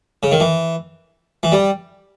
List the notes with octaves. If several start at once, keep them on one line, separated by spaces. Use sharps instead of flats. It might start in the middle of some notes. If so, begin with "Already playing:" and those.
C#3
D#3
E3
E3
G3